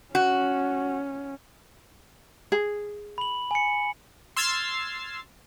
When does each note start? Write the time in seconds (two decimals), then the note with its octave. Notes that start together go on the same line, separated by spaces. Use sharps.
0.15 C#4 F#4
2.52 G#4
3.18 B5 F#7
3.51 G#5 C#7
4.36 C6 E6 F6 G#6 A6 C7